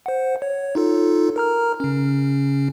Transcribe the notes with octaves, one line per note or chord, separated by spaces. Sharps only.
C5 F#5
C#5
D#4 F4 A4
A#4 A#5 F6
C#3 C#4